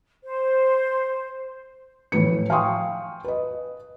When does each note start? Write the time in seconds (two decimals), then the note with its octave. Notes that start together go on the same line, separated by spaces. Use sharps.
0.24 C5
2.12 A2 E3 F3 B4 C#7
2.50 F5 G5 G#5 C6 C#6 D#6
3.24 B4 D#5